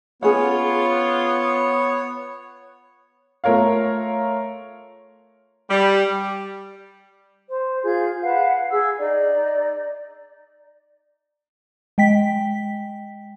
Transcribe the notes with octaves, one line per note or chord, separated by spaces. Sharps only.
B3 C#4 F4 G#4 C#5 F#5
A3 F4 A#4 C#5 F5
G3
C5
F4 G#4 G6
B4 F5 F#5 A5
G#4 E6
D#4 D5
G#3 G5 B6